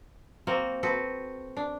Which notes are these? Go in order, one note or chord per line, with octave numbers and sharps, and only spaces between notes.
A#3 C4 F#4
C4 F#4 A4 B4
D4